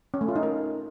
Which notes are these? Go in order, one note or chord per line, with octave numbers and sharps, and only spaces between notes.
C#4
A3
F4
D#4
A#4